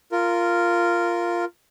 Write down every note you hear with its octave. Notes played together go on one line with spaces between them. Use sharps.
F4 A#4